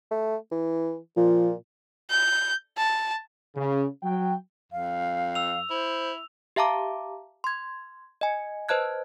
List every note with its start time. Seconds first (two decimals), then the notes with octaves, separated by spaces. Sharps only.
0.11 A3
0.51 E3
1.17 A#2 F3
2.10 G6
2.78 A5
3.56 C#3
4.03 F#3 G5
4.72 F2 F5
5.35 E6 F7
5.70 E4 C5
6.56 G4 E5 F5 A5 A#5 D6
7.44 C6 G#6
8.21 D#5 G#5
8.69 B4 C5 D#5 A5 F#6 G#6